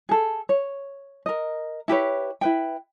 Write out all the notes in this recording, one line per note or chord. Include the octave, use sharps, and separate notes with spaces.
G#4 A4
C#5
A#4 D#5
E4 G4 B4 C#5
E4 B4 G5